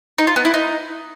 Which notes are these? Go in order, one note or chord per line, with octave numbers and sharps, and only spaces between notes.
D#4
F4
B3
E4
D#4